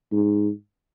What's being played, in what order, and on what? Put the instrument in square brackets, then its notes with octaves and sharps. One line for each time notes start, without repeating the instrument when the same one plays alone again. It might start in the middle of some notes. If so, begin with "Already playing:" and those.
[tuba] G#2